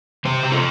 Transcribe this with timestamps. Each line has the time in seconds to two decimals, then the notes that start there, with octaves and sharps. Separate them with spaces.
0.25 C3 G4 C5
0.43 C3 G4
0.52 F4 A4